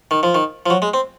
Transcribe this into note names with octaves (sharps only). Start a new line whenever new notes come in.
D#3
F3
D#3
F3
F#3
G#3
C4